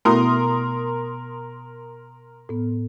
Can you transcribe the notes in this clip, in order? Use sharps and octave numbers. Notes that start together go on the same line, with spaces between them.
B2 A3 B3 E4 F#4 A#4 C6 D#6
A2 B3